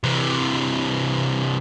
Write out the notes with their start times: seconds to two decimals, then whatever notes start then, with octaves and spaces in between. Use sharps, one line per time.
0.04 C3 E3